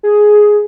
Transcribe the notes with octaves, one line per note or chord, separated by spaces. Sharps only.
G#4